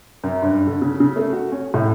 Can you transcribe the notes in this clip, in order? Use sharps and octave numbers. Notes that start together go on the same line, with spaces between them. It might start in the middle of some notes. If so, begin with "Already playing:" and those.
F#2
G2
D3
C#3
C#3
A3
F#4
C#4
A2